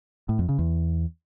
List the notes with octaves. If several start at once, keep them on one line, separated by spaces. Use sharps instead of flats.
A2
F2
C#3
E2